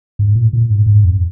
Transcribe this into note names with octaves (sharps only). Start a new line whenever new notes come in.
G#2
A#2
A#2
G#2
G#2
F2